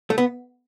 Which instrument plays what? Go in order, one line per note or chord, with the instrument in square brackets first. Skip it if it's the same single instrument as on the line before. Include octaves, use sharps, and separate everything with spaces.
[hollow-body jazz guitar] A3
B3